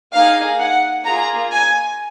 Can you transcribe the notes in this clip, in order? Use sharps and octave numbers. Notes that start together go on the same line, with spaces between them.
A#3 D#4 G#4 F5
F#5
A#3 F4 G#4 A#5
G#5